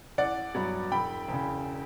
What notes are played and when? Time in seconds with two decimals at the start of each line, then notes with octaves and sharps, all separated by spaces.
0.18 A1 D5 F#5
0.55 G2 F#3 B3
0.92 E1 G5 B5
1.29 E2 C#3